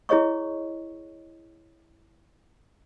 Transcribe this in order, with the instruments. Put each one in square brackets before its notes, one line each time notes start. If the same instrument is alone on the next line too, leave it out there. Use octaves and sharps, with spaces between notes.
[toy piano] E4 G#4 C#5 D#5 C#6